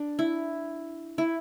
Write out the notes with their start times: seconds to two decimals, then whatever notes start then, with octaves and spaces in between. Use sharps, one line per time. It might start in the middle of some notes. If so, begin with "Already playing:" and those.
Already playing: D4
0.19 E4
1.18 E4